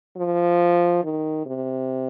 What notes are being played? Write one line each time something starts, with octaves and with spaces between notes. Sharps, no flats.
F3
D#3
C3